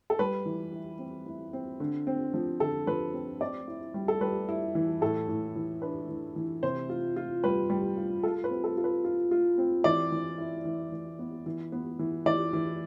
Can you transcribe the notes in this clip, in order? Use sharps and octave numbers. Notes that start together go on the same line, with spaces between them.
A4
G3 B4
E3
E4
C4
E4
C4
D3
C4
F3
D3 A4
F3 B4
C4
C4 D5
E4
G3
A4
G3 B4
E4
E3
A2 A4
A2
E3
D4 B4
E3
E3
C3 C5
F4
F4
G3 B4
G3
F4
F4 A4
B4
C4
A4
F4
B4
F4
F4
C4
E3 D5
E3
E4
E3
E3
B3
E3
B3
E3
E3 D5
E3